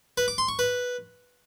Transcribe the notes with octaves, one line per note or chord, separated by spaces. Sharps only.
B4
D6
C6
C#6
B4